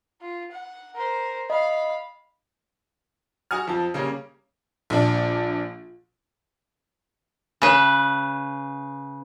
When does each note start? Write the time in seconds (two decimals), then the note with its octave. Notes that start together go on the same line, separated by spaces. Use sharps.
0.22 F4
0.52 F#5
0.95 A#4 C5
1.50 D#5 F5 B5
3.51 F#4 F#5 G#5 D#6 F6
3.67 F2 F3 A5
3.94 C#3 G3 A#3 C#4 C#5
4.90 A#1 D4
7.62 C#3 B4